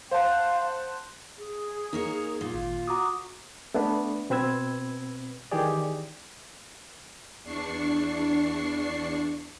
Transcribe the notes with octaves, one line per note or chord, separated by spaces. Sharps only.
C5 F5 F#5 A5
G#4
A#3 D#4 A#4 C#5
A#2 F4
G#1
F#4 A#5 D6 D#6
A3 B3 D4
B2 C4 B4 E6 G#6
D#3 E3 G4 G#4 D5
E2 D4 C#6 C7